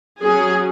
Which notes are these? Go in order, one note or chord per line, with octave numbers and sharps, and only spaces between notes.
F#3 C#4 G#4